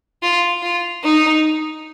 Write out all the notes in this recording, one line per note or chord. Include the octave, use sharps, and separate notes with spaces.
F4
F4
D#4